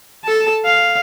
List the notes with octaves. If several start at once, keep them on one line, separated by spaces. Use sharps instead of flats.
A4 A5
F5